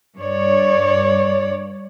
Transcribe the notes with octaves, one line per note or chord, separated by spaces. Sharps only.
G2 C#5 D5